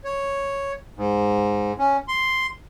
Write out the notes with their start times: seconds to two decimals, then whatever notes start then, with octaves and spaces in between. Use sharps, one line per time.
0.04 C#5
0.97 G#2
1.79 C#4
2.08 C6